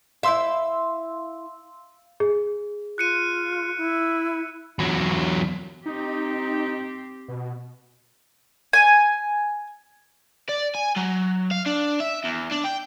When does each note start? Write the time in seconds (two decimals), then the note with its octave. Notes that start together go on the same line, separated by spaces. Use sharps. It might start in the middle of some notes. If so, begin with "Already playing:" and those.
0.23 E4 C5 E5 F5 C6 E6
2.20 G#4
2.98 F4 F#6 C#7 D#7
3.78 E4
4.79 E2 F#3
5.86 C4 D#4 G4
7.28 B2
8.73 G#5
10.49 D5
10.75 G#5
10.96 F#3
11.51 F5
11.66 D4
12.00 E5
12.24 E2
12.52 D4
12.65 G5